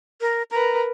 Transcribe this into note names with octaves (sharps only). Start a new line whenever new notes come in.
A#4
A#4 B4 A#5